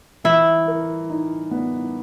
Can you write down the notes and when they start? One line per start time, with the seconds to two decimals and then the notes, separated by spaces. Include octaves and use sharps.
0.24 E3 E4
0.67 A#4
1.10 D#4
1.51 B3